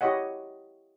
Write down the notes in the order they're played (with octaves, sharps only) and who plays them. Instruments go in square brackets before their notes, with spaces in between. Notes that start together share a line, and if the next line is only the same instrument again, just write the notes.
[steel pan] E4 G4 C#5 D#5 F#5